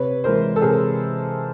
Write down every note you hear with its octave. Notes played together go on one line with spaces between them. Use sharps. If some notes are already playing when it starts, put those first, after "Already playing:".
Already playing: C3 B4 C#5
E3 G#3 A#4 C5
A4
C3 G#4 A#4